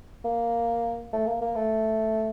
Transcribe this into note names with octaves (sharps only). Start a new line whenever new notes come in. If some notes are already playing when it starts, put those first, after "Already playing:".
A#3
A3
A#3
A#3
A3